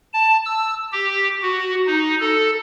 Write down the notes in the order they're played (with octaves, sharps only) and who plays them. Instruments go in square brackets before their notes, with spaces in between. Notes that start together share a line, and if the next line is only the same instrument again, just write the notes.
[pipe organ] A5
E6
G4
F#4
D#4
A4